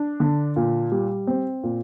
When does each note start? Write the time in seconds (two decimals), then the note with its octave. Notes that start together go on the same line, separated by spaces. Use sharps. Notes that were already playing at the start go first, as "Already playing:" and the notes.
Already playing: D4
0.20 D3
0.56 A#2
0.92 G3
1.27 C4
1.63 A#2